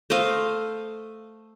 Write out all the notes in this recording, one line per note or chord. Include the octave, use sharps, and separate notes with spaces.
A3 C5 D#5 F5